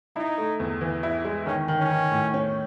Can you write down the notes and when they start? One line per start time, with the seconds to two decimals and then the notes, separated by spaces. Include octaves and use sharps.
0.16 D#4 E4
0.38 A3
0.60 E2
0.81 E3
1.03 E4
1.25 G#3
1.46 D#3 C#4
1.68 D#3
1.79 C#4
1.91 D#3
2.12 A2
2.34 C#4